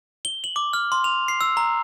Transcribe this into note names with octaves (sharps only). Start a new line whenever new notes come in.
G7
F#7
D6
F6
C6
F7
C7
E6
A#5